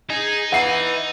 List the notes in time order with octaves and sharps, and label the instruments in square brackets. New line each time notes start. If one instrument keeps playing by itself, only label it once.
[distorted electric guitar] D#4 [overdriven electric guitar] G#4
[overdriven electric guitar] B4 E5 [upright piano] F#5 C7 D#7